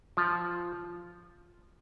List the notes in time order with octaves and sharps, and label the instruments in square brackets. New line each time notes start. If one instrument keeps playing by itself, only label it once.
[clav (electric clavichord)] F3